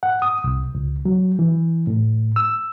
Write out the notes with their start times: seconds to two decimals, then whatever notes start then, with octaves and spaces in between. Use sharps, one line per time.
0.03 F#5
0.22 D#6
0.44 C2
0.75 C#2
1.05 F#3
1.39 E3
1.87 A2
2.36 E6